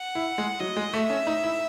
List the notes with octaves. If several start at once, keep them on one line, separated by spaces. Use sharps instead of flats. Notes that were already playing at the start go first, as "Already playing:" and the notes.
Already playing: F#5
E4
G#3
F#3 D#5
G#3
A3 E5
C#4
D#4
E4